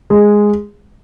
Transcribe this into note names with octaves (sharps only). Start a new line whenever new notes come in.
G#3